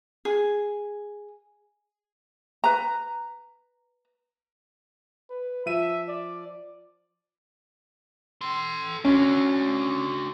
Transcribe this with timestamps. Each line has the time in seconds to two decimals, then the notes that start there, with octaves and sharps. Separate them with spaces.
0.25 G#4
2.64 B4 A#5
5.30 B4
5.66 F3 E5 D#7
6.08 D5
8.41 A4 C6
9.05 C#4 D4 F#4